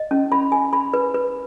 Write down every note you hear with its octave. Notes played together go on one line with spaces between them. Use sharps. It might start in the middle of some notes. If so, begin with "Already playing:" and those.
Already playing: D#5
C#4
B5
G#5
B5
B4
B4